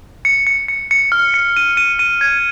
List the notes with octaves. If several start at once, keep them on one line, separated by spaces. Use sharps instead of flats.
C#7
C#7
C#7
C#7
F6
C#7
D#7
D#7
D#7
G#6